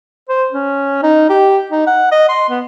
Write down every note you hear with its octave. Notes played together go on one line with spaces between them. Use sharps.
C5
C#4
D#4
G4
D#4
F#5
D#5
C6
B3